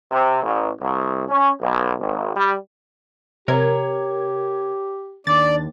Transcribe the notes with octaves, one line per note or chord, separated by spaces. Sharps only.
C3
A1
C2
C#4
B1
G#1
G3
C3 G4 A#4 C#5 A#5 G#6
D#2 D4 D5 A6